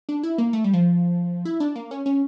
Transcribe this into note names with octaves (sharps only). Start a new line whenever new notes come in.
D4
E4
A#3
A3
G3
F3
E4
D4
A#3
C#4
C#4